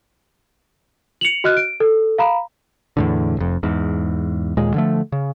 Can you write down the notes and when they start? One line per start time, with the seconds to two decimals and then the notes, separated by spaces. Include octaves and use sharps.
1.21 C#7 F7 F#7
1.44 F#4 D#5 F6 F#6
1.57 D7
1.80 A4
2.18 F5 A#5 B5
2.97 E2 A2 D3
3.37 F1 F2
3.63 E2 G#2
4.57 D#2 A#2 G#3
4.74 D3 F3 A3
5.12 C#3